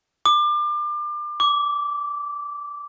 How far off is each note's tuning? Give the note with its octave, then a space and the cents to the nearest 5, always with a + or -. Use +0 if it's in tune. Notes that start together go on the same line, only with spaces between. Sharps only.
D6 +30
D6 -15